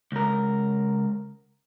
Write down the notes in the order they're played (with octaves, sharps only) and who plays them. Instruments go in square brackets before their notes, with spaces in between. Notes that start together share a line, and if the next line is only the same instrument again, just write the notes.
[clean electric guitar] C#2 A#4